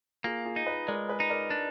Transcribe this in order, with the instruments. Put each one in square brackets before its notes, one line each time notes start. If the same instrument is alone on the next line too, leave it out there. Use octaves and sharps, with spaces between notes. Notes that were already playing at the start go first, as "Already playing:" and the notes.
[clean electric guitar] A#3 [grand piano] F4 G#4
[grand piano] F4 G#4
[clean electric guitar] D#4
[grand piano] B4 D#5
[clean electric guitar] G#3 [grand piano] A#4 D5
[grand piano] G#4 B4
[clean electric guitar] D#4
[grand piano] A#4 D5
[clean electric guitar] D4